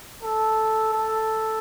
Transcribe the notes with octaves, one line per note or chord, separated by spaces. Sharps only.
A4
A4